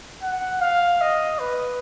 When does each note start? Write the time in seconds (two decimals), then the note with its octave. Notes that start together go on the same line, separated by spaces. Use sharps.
0.22 F#5
0.61 F5
1.01 D#5
1.39 B4